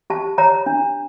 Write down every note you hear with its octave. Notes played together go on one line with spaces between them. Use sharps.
G4 A5
C#5 A#5
D4